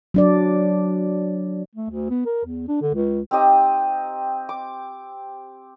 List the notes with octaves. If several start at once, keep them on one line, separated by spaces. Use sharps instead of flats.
F#3 D4 D5
A3
D2
B3
A#4
E2
D4
D3
C#2
C4 D#4 G4 D#5
D6